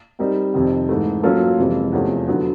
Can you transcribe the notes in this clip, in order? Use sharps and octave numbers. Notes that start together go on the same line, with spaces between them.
G3 C4 D#4 G4 A#4
F2 C3 D#3
G#2 E3 A3
F#3 A#3 C#4 F4 A4
F2 C3 E3 G#3
E2 C3 F3 A3 C#4
D3 F#3 B3